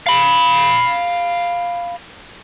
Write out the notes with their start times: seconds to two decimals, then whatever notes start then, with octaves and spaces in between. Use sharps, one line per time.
0.07 F5 B5